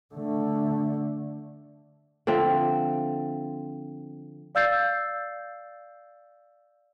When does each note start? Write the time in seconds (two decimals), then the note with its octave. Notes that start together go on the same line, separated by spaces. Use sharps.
0.14 D3 A3
2.27 D3 F3 C4 E5
4.55 D5 F5 E6 G6 A6 C7